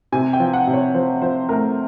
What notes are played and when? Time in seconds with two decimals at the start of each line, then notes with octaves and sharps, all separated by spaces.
0.12 C3 G#5
0.33 G5
0.40 F3
0.53 F#5
0.67 C3
0.73 C#5
0.94 F3 C5
1.22 F3 C5
1.49 A3 A#4